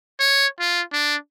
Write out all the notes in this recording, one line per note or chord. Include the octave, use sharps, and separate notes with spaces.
C#5
F4
D4